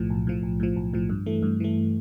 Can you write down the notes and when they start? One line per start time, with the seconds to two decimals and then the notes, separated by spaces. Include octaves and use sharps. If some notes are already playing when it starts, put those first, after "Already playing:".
Already playing: B1 A2 F3
0.10 B1
0.27 A2 F3
0.43 B1
0.60 A2 F3
0.76 B1
0.94 A2 F3
1.10 G2
1.26 E3 A3
1.43 G2
1.60 E3 A3